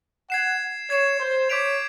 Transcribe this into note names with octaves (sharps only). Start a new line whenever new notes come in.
F#5 G#6 C7 E7
C#5 G#6 C7 E7
C5
C#5 D6 G6 B6 D7 F7